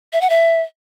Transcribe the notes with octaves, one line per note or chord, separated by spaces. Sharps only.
E5
F#5
E5